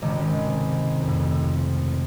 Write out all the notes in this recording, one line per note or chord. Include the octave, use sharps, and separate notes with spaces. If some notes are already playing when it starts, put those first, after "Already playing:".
G#1 C#2 C3 D#3 G#3
F2 A2